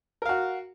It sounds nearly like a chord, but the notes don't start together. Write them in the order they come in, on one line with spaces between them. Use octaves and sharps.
A#4 F5 F#4